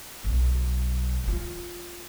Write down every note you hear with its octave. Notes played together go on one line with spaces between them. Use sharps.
B1
E4 F4